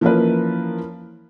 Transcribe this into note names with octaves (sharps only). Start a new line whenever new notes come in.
E3 F3 A#3 C#4 A#4 B4